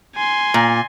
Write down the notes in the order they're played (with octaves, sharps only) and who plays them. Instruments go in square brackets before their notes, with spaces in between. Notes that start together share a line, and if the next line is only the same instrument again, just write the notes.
[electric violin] G#5 C6
[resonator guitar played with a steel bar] A#2